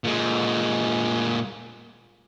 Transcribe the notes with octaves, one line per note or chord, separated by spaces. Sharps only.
A#2 G#3